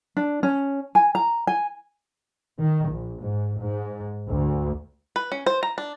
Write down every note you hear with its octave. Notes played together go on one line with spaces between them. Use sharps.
D4
C#4
G#5
A#5
G#5
D#3
A#1
G#2
G#2
D2
B4
C#4
C5
A#5
D4